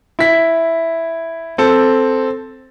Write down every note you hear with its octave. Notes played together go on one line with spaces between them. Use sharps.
E4 B6
C4 A4